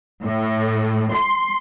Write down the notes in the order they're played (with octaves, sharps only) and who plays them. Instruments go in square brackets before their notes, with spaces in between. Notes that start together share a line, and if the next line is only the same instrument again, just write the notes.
[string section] A2
C6